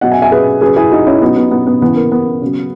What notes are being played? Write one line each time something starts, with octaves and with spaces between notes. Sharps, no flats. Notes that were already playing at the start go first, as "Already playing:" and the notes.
B2 F#3 D#5 F#5
E5 G#5
E5 G#5
G#4 B4
C#3 F#3 G#4 B4
E4 G#4
D#4 F#4
C#4 E4
B2 F#3 B3 D#4
B3
B3
B3
C#3 E3 B3
A#3
B3
C#3 F#3